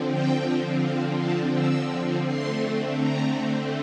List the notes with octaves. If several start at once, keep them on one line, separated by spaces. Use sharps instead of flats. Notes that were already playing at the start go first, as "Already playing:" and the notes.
Already playing: D3 F3 C4
G5
F5
A5
E6
D3 A3 C4 C6
A#5